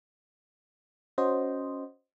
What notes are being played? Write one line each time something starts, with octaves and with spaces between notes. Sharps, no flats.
C#4 F#4 C5 D#5